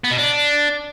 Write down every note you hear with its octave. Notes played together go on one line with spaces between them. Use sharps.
B3
B2
D4